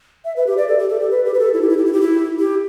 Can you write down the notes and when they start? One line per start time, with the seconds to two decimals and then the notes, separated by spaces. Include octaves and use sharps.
0.25 E5
0.36 B4
0.47 G4
0.57 D5
0.68 A4
0.79 G4
0.89 A4
1.00 G4
1.11 B4
1.25 G4
1.34 B4
1.39 A4
1.54 E4
1.62 G4
1.69 E4
1.78 G4
1.85 E4
1.93 G4
2.01 E4
2.39 G4